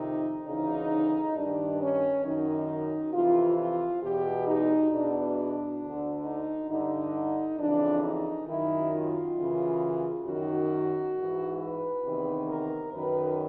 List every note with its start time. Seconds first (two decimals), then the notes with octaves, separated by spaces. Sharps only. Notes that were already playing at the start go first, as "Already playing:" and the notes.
Already playing: F2 C3 D#3 D#4
0.47 D2 C#3 E3 D#4
1.36 G2 D#3 D4
1.80 C#4
2.25 F#2 D#3 D#4
3.14 F2 C3 E3 F4
3.58 F4
4.03 E2 B2 G4
4.47 D#4
4.92 E2 B2 D4
5.81 D2 D3
6.26 D#4
6.70 G2 D3 D#4
7.59 F2 C#3 E3 D4
8.04 D#4
8.48 F#2 D#3 E4
8.93 F4
9.37 F#2 C#3 E3
10.26 F#2 D#3 F#4
11.15 G#2 E3
11.60 B4
12.05 E2 C3 D#3
12.49 A#4
12.94 F#2 D#3 B4